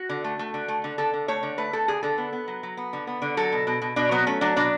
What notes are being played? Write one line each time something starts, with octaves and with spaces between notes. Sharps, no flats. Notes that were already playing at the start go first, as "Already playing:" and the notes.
Already playing: F#4
D3
A3
A3
D3
A3
D3
D3 A4
D3
A3 C#5
D3
A3 B4
A3 A4
D3 G#4
D3 A4
B3
B3
F#3
F#3
B3
D3
B3
D3
F#3 A4
B2
B2
B2
B2 D4
F#3 B3
A3 C#4
F#3 D4
B2 D4